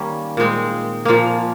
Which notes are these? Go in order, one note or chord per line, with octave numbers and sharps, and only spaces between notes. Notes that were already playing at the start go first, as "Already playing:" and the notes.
Already playing: D#3 G3 A#3 C#4
A#2 G#3 C4
A#2 F3 A#3